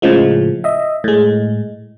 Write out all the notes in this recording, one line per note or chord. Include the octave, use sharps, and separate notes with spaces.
A2 C#3 F3 G#3
D#5 E5
A2 G#3